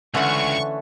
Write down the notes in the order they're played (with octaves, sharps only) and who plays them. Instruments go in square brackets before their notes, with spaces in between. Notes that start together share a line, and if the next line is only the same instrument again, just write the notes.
[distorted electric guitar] C#2 [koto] D3 F#5 [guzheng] E3 A3 C#4 [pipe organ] C#6